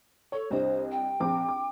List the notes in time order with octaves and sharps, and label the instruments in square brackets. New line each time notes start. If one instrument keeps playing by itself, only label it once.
[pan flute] A4 [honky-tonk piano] C#5
[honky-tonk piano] C2 D4 D#5 [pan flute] C5
[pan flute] G5
[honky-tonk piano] A#1 C4 D6
D6